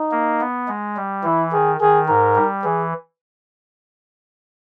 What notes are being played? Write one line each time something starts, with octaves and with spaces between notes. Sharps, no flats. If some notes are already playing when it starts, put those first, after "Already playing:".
Already playing: D#4
A#3
B3
G#3
G3
E3 E4
D#3 G#4
D#3 G#4
G#2 A#4
G3
E3 G#4